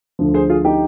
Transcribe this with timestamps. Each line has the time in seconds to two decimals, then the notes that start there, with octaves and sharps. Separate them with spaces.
0.19 D2 D3 F3
0.34 G#4 C5
0.49 F4 G#4
0.64 D#4 G4